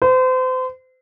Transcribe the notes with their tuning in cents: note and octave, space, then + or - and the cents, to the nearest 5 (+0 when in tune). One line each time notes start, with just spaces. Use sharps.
C5 -35